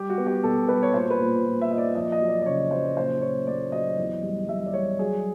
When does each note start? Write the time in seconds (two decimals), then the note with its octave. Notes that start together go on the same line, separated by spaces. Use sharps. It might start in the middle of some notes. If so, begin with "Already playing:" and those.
Already playing: G3 G4
0.10 F#4
0.18 B3
0.26 G4
0.43 B2 A4
0.69 G3 B4
0.83 C#5
0.94 A#2 C5
1.10 B4
1.19 A#2
1.44 A#2
1.61 E5
1.70 A#2 D#5
1.78 D5
1.95 F2 D#5
2.12 D#5
2.21 F#3
2.28 D5
2.42 D5
2.46 C#3 C#5
2.71 F#3 C5
2.96 A#2 C5
3.21 A#2 C#5
3.47 A3 D5
3.72 F#3 D#5
3.98 E2
4.23 G3
4.48 G3 E5
4.66 D5
4.74 G3 C#5
4.99 F#3 G#4